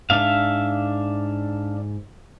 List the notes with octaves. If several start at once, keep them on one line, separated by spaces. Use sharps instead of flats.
G#2 D4 E5 F5